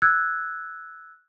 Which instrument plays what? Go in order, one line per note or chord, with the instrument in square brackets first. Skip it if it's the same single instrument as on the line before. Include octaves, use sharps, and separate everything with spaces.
[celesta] E6 F#6 G#6